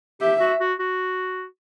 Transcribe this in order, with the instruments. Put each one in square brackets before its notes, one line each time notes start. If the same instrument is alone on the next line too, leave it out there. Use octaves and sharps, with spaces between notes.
[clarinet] G4 [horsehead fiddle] E5
[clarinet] F#4
F#4
F#4